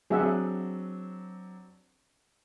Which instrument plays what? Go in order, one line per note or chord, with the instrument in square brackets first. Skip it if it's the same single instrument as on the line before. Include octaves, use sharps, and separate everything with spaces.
[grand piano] F#3 C4 D4 [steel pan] G#4 E5 F#5